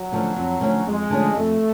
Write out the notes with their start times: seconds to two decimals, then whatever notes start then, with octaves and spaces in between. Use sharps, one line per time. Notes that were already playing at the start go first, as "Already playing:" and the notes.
Already playing: F#3
0.12 D3 F3 A3 C#4
0.36 F2
0.61 D3 F3 A3 C#4
0.86 F2 G#3
1.10 D3 F3 A3 C#4
1.34 F2 A3